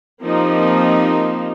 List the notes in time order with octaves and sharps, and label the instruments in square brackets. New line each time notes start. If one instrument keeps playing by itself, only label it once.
[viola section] F3 A#3 C4 D#4 G4